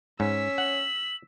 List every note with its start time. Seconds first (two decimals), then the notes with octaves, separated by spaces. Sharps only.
0.20 G#2 C#4 E6 B6
0.58 F#5 F#7